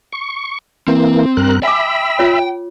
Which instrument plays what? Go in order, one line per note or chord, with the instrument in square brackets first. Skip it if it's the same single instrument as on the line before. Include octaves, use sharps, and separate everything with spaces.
[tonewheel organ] C#6
[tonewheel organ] E3 A#3 [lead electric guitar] C4
[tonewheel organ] G2 A#4 F#6
[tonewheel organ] E5 B5 [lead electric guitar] G5 [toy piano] G#5 D6
[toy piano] F4 C#5